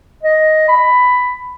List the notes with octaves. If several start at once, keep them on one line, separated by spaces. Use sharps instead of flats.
D#5
B5